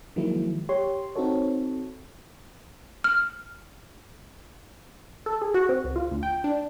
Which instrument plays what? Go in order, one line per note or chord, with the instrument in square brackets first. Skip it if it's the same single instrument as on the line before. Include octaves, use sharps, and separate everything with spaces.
[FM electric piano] D#3 F3 F#3 G#3 A#3 E4
G4 C#5 C6
C4 D#4 F#4 A4 C#5
[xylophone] F6
[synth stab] A4
G#4
F#4
C4
C#2
F4
D2
G5
D4